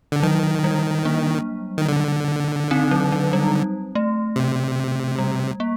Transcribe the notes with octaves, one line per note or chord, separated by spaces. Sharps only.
D3
D#3 F#3
G3
A#3 D4
D#3
D3
C4 D#4
F#3
F#3
G3
A3
C3
G3
A#3